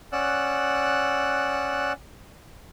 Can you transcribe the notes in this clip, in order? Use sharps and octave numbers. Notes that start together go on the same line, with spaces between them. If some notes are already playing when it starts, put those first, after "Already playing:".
C#4 D5 F#5 E6 F#6